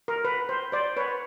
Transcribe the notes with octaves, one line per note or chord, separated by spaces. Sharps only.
A#4
B4
C5
C5 D5
B4 C#5